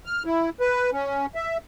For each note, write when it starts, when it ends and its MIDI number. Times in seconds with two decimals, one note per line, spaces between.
0.06 0.23 89
0.25 0.50 64
0.61 0.90 71
0.92 1.26 61
1.35 1.57 76